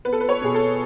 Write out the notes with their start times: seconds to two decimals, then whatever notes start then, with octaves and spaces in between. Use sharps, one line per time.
0.05 B3 B4
0.13 A4
0.20 B4
0.29 C#5
0.41 B2 G#4
0.55 A4